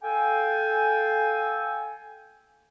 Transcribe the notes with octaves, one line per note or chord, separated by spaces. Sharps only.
A4 F5 G5 G#5